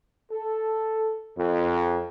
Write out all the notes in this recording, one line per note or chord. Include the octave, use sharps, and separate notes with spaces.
A4
F2